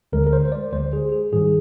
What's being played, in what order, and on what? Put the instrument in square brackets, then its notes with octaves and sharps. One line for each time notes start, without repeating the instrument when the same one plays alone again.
[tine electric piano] D2 D3 G#3 A#4
A#4
C5
C5
D5
D2 D3 G#3 C5
G#4
G#4
G#2 D#3 G3 G#4